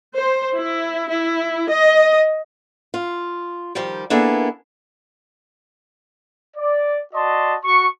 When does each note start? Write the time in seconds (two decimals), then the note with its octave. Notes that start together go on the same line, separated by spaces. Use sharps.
0.17 C5
0.57 E4
1.10 E4
1.71 D#5
2.94 F4
3.75 D#3 F3 G3 G4
4.10 A#3 B3 D4 E4 G#4 A4
6.57 D5
7.14 F#4 D5 D#5 A5 C6
7.65 F#4 C#6